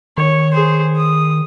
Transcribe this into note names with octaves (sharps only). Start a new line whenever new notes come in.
D#3 C#5
G#4 C5
D#6